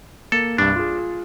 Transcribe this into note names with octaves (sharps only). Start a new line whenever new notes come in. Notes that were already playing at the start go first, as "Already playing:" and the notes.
A#3 A4
C2 G2 D4
F4 G#4